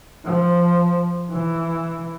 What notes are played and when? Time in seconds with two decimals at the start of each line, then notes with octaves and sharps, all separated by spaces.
0.25 F3
1.31 E3